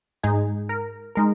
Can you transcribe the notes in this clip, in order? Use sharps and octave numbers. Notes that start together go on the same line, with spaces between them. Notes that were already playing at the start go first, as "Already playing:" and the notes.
G#2 G#3 D#4 G#4
A#4
G#3 D#4 A#4